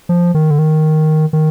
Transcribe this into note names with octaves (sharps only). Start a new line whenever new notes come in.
F3
D#3
D3
D#3
D#3